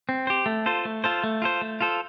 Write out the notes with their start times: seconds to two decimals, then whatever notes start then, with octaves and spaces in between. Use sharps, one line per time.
0.09 C4
0.27 G4 C5
0.46 A3
0.66 F4 A4 C5
0.85 A3
1.04 F4 A4 C5
1.24 A3
1.42 F4 A4 C5
1.62 A3
1.81 F4 A4 C5